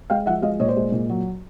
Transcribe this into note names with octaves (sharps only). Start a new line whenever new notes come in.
G#3 F5 G5
F3 E5 F#5
G#3 D#5 F5
A#2 C#5 D#5
C5 D5
G#3
A#2
F#3